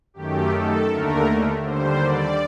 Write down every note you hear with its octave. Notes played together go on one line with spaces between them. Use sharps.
F#2 D#3 A3 G4
A4
D#2 D3 A3 A#4
D#2 D3 G3 C5
D5